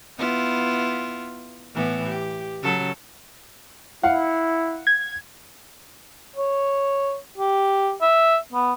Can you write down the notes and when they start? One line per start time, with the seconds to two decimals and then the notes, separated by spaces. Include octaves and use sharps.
0.19 B3 E4 F4
1.75 A2 E3 B3
2.08 G4
2.62 C#3 F#3 A4
4.03 E4 F5 F#5
4.87 G#6
6.36 C#5
7.38 G4
8.02 E5
8.53 B3